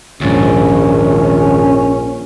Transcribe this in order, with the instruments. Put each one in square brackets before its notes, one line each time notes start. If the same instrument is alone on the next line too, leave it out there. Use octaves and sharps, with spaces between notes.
[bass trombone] A#1 [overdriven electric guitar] D#2 G#2 [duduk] C#4